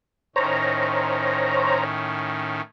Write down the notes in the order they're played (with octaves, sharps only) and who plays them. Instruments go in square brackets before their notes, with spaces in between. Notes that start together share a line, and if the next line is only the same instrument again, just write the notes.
[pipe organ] A2 D#3 C#4 [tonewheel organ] C5 C#5 A#5